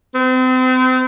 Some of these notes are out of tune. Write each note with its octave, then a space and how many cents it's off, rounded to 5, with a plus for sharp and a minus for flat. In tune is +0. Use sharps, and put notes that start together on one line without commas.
C4 -35